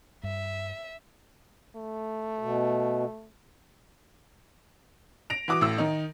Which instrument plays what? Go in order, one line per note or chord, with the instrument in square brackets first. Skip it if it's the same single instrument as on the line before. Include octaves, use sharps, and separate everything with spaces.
[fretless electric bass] G2 [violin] E5
[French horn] A3
[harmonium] B2
[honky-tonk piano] A#6 D7 F7
E3 F#4 D6 D#6 D7
A1 A2 E6
D#3 D#4